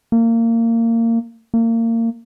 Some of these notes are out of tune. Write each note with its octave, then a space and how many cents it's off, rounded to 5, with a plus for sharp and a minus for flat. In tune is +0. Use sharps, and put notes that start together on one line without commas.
A#3 -25
A#3 -30